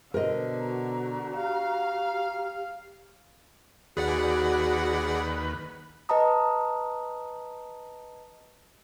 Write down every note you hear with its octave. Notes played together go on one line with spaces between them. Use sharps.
B2 D3 A#4 C5 D#5
F#4 A#5
G4 F5
D#2 F#4 G#4 B4 D5 F#5
B4 D#5 A5 A#5 D#6